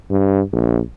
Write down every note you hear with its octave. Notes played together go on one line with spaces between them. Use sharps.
G2
A#1